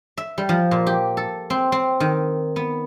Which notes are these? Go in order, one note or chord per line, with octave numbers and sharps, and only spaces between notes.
E5
G3
F3
A#2
G4
A4
C4
C4
D#3
B3